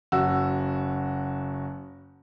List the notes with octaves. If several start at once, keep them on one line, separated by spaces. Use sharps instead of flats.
F#1 F#4 E6